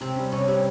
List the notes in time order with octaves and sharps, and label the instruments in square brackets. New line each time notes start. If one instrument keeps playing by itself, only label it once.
[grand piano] C3 [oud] C4
[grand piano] G3 C#4
[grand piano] C3 [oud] C#4
[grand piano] G3 C#4 [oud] C4